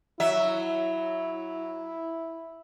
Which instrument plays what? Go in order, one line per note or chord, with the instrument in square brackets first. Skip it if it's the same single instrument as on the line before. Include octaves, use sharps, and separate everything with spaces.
[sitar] F#3 E5 [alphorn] E4